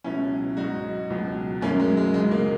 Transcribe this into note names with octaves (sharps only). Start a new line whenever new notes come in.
C#2 B2 F#3 C#4 E4
G#2 F#3 D#4 F#4
C#2 B2 F#3
F#2 D#3 F#3 A#3 C#4
G#3
G#3
C#2 C#3 F#3 G#3
A#3